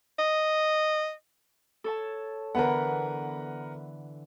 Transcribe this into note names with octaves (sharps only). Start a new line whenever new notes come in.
D#5
A4 C#5 A5
D3 E3 B3 A#4 B4 F#5